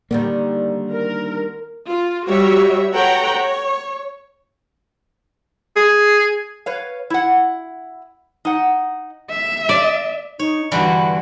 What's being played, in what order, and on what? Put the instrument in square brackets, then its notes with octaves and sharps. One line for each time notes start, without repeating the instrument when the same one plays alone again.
[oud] D3 D#3 G3 [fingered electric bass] A#3
[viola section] A#4
F4
G3 F#4 C#5 E5
A4 B4 C#5 F#5 G5 A#5
C#5
[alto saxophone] G#4
[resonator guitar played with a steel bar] B4 C#5 F5
E4 F#5
D#4 F#5
[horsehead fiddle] E5
[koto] D5
[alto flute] D#4 [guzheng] C#5
[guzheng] G2 D3 E3 [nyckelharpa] F#4 [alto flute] B5